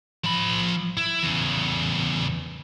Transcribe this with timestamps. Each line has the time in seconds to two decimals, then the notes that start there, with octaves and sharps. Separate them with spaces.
0.24 F3 B5
0.97 E4
1.23 E2 C#3